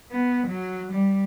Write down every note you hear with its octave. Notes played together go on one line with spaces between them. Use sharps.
B3
F#3
G3